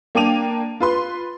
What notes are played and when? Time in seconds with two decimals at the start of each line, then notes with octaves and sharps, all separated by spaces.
0.15 A#3 D4 G5 D6 D#7 F7
0.80 F4 B4 C6